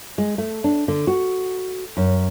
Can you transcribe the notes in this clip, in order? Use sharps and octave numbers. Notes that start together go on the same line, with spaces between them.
G#3
A3
D4
D3
F#4
F#2